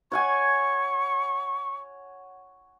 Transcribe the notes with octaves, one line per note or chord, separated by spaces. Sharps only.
C#5 F#5 G#5 C#6